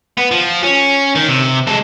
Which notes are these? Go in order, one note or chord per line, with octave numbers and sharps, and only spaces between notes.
B3
F3
C#4
D#3
C3
G#3 A4